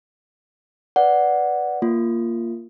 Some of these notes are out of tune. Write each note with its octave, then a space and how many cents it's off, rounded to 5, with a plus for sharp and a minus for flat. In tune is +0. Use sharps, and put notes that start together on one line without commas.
B4 +0 D5 -5 F#5 +0
A#3 +0 F4 -10